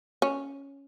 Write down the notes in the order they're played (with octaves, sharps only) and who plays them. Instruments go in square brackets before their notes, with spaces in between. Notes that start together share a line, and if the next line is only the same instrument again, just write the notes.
[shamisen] C#4